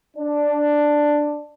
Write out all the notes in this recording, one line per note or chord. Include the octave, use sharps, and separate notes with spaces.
D4